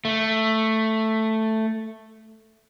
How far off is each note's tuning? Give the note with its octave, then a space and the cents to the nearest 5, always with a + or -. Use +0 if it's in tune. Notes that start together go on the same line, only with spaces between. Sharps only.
A3 +5